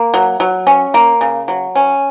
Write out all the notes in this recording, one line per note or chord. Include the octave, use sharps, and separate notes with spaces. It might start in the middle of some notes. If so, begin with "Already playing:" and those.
Already playing: A#3
F#3
F#3
C#4
A#3
C#3
F#3
C#4